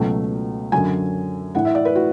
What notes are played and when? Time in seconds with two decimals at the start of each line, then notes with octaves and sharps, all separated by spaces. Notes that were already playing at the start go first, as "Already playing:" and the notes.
Already playing: C#2 B2 F#3 A3
0.72 F#2 D3 F#3 G#5
1.54 A2 E3 A3 F#5
1.65 E5
1.75 D5
1.85 B4
1.95 F#4